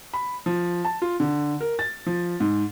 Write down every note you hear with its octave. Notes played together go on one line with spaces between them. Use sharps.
B5
F3
A5
F4
D3
A#4
A6
F3
G#2